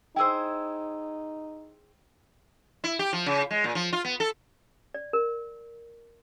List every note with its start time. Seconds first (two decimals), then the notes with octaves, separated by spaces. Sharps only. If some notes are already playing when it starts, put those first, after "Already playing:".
0.16 D#4 E4 G#4 C5 G5 E6
2.84 E4
2.99 G4
3.13 F3
3.26 C#3
3.51 G#3
3.64 A#2
3.75 F3
3.93 F4
4.05 B3
4.20 A4
4.94 D5
5.13 A#4